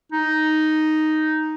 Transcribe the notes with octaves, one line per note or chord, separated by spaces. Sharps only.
D#4